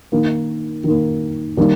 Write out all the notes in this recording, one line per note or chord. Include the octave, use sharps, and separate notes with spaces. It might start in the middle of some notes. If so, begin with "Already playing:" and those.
D#3 A#3
D#3 A#3
D#3 G3 A#3